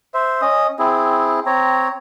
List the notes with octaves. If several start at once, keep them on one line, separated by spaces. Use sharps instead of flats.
C5 E5
C#4 D#5 D#6
C4 E4 G#4
C4 C#5 A#5